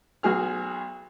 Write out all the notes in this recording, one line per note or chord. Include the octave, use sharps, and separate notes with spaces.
B1 F#4 G#4 F6